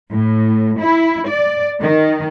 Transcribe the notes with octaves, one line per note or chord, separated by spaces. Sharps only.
A2
E4
D5
D#3